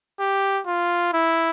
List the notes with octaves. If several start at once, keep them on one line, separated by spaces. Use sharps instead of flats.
G4
F4
E4